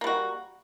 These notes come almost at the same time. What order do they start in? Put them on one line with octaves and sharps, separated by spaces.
A#3 G3 F#4